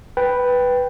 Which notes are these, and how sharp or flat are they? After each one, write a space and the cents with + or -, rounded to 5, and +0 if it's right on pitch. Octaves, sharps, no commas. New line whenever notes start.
B4 +0 G5 +0